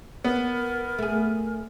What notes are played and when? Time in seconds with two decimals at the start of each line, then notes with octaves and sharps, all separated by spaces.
0.24 B3 A#4
0.99 A3 G#4